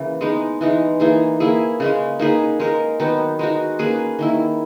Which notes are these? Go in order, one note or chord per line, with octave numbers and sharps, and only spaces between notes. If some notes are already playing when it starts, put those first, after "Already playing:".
Already playing: C#3 E3 A#3
G#3 B3 D#4
E3 G#3 D#4
E3 A#3 D#4 G#4
A#3 E4 G#4
C#3 G#3 C#4
A#3 D#4 G#4 B4
G#3 D#4 A#4
D#3 F#3 B3 D#4
G#3 D#4 F#4
A#3 C#4 G#4 B4
D#3 A#3 E4